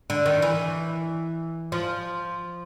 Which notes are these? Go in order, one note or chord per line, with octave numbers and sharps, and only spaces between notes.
D3
D#3
E3
F3